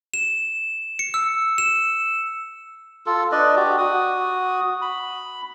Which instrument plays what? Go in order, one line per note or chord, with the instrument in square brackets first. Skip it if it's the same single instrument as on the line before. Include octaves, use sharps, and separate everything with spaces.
[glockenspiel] E7
C#7
E6
E7
[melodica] F4 A4
D4 B4 D5 D#5
F#4 G4
F#4 D#6
B5